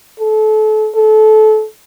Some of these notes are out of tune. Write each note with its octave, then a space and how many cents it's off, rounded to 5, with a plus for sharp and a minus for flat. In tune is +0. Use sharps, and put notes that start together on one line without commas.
A4 -30
A4 -25